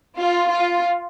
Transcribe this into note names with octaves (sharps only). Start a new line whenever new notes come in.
F4
F4